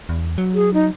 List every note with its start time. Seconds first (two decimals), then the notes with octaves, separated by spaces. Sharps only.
0.09 E2
0.38 F#3
0.55 G#4
0.74 D#4